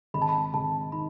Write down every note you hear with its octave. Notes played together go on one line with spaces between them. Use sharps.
G#1 B5
A5
B5
G#1 A5
D#3 B5